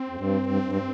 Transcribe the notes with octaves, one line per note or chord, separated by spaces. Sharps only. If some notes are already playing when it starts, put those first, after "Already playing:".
Already playing: C4
F2
G2
G2
G2